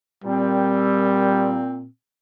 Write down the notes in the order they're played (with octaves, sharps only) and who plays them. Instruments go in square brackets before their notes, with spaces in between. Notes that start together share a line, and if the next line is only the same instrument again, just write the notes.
[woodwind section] A#2 C4 [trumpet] G3